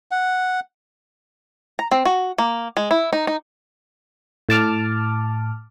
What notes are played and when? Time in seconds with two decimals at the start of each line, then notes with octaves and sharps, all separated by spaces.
0.11 F#5
1.79 A#5
1.91 C4
2.05 F#4
2.38 A#3
2.77 G#3
2.91 E4
3.13 D#4
3.27 D#4
4.49 A2 A5 D6 F6